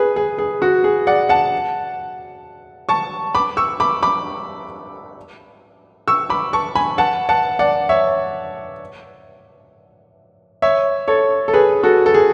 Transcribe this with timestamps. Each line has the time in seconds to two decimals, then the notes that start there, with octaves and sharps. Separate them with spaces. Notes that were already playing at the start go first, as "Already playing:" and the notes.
Already playing: G#4 B4
0.16 G#4
0.38 G#4
0.62 F#4
0.84 G#4
1.07 D5 F#5
1.29 F#5 A5
2.89 A5 C#6
3.35 B5 D6
3.57 C#6 E6
3.80 B5 D6
4.03 B5 D6
6.08 C#6 E6
6.30 B5 D6
6.53 A5 C#6
6.75 G#5 B5
6.98 F#5 A5
7.29 F#5 A5
7.59 D5 F#5
7.89 C#5 E5
10.62 C#5 E5
11.08 A4 C#5
11.48 A4
11.54 G#4 B4
11.83 F#4 A4
12.06 A4
12.14 G#4